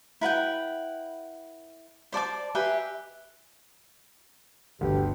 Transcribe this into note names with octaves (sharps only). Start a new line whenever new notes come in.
E4 B4 F#5 G5
C5 D5 A5 D6
G4 G#4 B4 E5
G1 D2 G4 B4